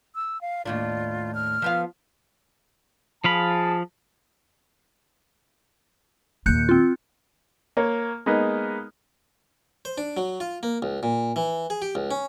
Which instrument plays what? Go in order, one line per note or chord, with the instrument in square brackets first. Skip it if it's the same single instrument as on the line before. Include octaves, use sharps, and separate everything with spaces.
[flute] E6
F5
[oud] D#2 A2 D4 [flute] F4
[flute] F6
[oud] F3 B3 F5
[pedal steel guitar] F3 F5 B5 [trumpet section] G#4 A5
[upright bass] D#2 A#2 [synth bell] F#6 G6 C#7
[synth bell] C4 F4
[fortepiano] A#3 C#5
G#3 A#3 B3 D#4
[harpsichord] C5
D4
F#3
F4
A#3
C#2
A#2
E3
G#4
G4
C#2
C#4